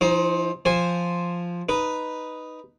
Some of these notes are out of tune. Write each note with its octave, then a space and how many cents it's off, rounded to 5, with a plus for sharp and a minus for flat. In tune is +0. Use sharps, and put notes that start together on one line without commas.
F3 -35 D#4 +25 C5 +15
F3 +0 C5 +0 G#5 -15
D#4 +0 B4 +0